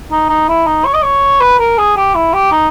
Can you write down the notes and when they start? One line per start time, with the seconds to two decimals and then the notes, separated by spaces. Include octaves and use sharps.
0.11 D#4
0.29 D#4
0.48 E4
0.66 D#4
0.85 C#5
0.94 D#5
1.02 C#5
1.40 B4
1.59 A#4
1.78 G#4
1.96 G4
2.15 E4
2.33 G4
2.51 D#4